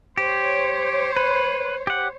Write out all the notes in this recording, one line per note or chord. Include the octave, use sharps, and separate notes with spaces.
G4 C5 C#5
B4
G4 F#5